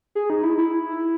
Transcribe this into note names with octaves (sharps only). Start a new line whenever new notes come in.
G#4
D#4
E4
E4